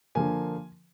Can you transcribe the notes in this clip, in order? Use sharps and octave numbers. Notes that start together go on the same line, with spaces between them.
D3 F3 A#3 G#5